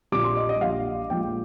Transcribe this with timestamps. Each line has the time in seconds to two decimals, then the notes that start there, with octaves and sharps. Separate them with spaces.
0.12 A#1 A#2 G3 D6
0.24 C6
0.36 D#5
0.49 D#5
0.61 A#1 A#2 G3 F5
1.10 A#1 A#2 F3 G#3 G5